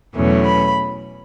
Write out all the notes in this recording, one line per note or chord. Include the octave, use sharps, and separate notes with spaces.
E2 B2 F#3 A3 C#4
B5